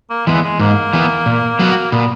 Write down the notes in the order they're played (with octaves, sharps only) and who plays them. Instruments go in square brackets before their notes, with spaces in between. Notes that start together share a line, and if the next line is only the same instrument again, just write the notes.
[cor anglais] A#3
[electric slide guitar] E3 B3 [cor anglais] G#3
[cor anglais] G#3
[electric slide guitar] G#2 [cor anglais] A#3
[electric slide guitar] E3 B3
A#2
F#3 B3 F#4
[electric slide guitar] A#2 [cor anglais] B3